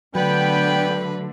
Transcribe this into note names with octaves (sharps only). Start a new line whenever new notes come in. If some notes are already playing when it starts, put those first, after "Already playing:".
D3 F#3 A3 B3 D4 B4 G5 B5